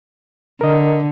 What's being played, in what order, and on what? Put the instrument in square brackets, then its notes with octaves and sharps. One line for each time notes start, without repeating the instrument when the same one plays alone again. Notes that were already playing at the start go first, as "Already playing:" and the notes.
[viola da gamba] D3 [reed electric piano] A#4 D#5